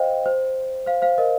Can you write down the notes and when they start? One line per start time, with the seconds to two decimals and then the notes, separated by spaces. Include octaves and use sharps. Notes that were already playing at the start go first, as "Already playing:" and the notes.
Already playing: C5 D#5 F5 G5
0.26 C5
0.86 C5 F5
1.02 C5 F5
1.18 A#4 D#5